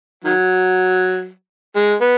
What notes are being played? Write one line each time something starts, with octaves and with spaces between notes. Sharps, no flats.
D#3 F#3
G#3
B3